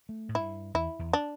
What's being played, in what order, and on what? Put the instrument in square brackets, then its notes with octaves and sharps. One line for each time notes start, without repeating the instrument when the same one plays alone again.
[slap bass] A3
A2
[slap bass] G2 [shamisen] E4
[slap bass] E2 [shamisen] E4
[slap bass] E2
[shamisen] D4